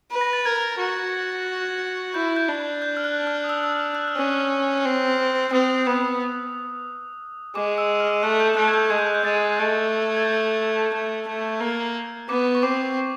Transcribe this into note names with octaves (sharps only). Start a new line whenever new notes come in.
B4
A#6
A6
A#4 G#6
F#4
E4 G6
G6
D4
G6
F6
F#6
F6
D#6
E6
E6
F6
F#6
F6
C#4 F#6
C4
C4 D#6
B3 D#6
G#3 D6
E6
F6
A3 F#6
G6
A3 F#6
G#6
G6
G#3 G#6
G6
F#6
G6
G#3 A6
A3
G#6
G6
A3
A3
A#3
B3 D6
C#6
C4 D6